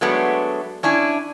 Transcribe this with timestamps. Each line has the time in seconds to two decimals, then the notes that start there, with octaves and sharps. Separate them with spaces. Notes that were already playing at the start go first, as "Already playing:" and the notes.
0.01 F#3 G#3 A3 B3 D4
0.83 C#4 D4 E4 G#5